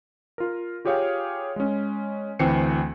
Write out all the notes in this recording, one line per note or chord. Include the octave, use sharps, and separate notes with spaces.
F4 A#4
F4 G4 G#4 C#5 F5 G5
G#3 C#4
D2 E3 C4 G5 C7 C#7